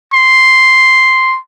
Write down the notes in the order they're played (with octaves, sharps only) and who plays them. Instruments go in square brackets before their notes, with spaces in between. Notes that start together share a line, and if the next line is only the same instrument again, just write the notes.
[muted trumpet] C6